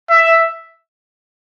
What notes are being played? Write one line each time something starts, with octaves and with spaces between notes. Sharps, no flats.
E5